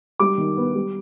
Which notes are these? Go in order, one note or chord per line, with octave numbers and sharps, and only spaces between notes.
G3 D6
D#3
B3
G3